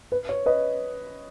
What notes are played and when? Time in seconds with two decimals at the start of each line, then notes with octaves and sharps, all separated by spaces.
0.12 B4
0.29 C#5
0.46 B4 D#5